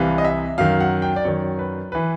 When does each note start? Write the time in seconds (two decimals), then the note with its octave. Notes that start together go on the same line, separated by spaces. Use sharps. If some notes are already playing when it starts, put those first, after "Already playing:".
Already playing: C2 C3 E3 F5
0.18 D#5
0.25 E5
0.58 F#2 D#3 F5
0.80 F#5
1.02 G5
1.16 D5
1.25 F#2 D#3 C#5
1.59 B4
1.92 E3 B4